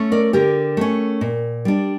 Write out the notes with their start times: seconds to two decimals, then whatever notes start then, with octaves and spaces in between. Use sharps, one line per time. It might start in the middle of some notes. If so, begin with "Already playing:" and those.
Already playing: A3 C#4
0.12 A#4 D5
0.33 D3 G4 A#4
0.77 A3 C#4
1.21 A#2
1.65 G3 D4